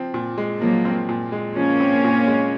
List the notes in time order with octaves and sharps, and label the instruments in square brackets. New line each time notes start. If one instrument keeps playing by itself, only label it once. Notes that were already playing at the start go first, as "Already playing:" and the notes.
Already playing: [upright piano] F3 C4
A#2
G#3
[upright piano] F3 [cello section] F#3 A#3
[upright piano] C4
A#2
G#3
[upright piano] F3 [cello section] A#3 C#4
[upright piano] C4
A#2
G#3